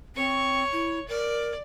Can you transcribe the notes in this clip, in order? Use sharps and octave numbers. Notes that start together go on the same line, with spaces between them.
C4 C#5 C#6
E4
A#4 D5